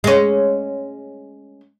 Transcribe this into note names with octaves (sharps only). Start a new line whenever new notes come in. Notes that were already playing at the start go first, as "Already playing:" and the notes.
G#3 C#4